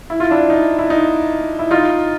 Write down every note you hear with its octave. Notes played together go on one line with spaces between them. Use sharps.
E4
F4
D4 E4
D#4
E4
D#4
E4
D#4 F4